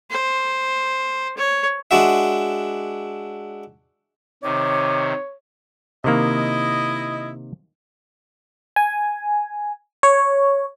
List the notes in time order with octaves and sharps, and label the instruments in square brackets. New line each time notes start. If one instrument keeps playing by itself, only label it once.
[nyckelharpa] C5
C#5
[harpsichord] G#3 D4 F#4 E5
[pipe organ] C3 D#3 [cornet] C#5 [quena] D6
[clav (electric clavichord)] C3 D#3 A#3 [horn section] E4 D#5
[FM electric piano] G#5
C#5